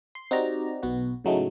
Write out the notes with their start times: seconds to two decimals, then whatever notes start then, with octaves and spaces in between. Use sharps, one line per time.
0.15 C6
0.31 C4 D#4 F#4 G4 D5 A#5
0.83 B1 B2 B3 F#4
1.24 A2 C#3 F#3 G#3 A3 D#4